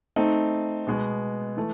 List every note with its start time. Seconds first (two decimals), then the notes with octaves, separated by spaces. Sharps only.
0.16 A3 C4 D#4
0.87 B2 G#3 B3
1.57 E3 A3